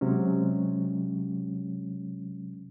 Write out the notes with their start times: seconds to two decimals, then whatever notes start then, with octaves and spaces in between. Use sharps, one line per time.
0.01 C3 F#3 G#3 C#4